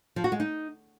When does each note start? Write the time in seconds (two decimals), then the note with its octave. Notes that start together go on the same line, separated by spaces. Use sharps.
0.16 F3
0.24 F#4
0.32 G#3
0.40 D#4